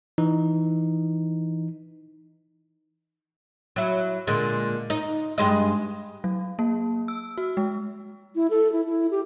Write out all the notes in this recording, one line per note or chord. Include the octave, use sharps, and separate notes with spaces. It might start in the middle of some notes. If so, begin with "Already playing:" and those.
E3 D#4
F#3 E4
A#2 D3 G#3
D#4
G2 G#3 D#5
F#3
A#3
E6
F#4
G#3
E4
A4
E4
E4
G4